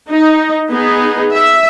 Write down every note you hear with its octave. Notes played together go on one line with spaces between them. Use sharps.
D#4
B3 D#4 G#4
E5